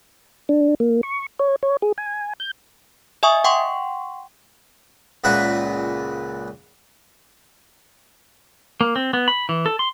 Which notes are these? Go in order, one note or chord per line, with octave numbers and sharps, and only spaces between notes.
D4
A#3
C#6
C#5
C#5
G#4
G#5
G6
D#5 E5 G#5 C#6 D#6
F#5 G5 C6 C#6
C#2 A#2 F#4 B4 E5 C#6
A#3
C4
B3
B5
E3
A4
C6